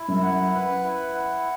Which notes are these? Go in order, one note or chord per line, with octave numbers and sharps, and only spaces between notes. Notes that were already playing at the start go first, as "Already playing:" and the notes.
Already playing: E4
F#2
F#5
B4
E4
F#5